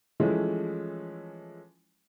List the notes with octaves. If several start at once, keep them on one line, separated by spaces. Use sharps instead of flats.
E3 F3 G#3 A3 C#4 E4